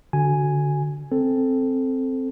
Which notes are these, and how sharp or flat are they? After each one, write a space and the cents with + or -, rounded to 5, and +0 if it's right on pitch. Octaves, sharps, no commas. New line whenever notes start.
D3 -15 F#4 +0 G#5 +0
C4 +0 A4 +0